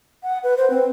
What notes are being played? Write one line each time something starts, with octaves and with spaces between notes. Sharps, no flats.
F#5
B4
C5
C4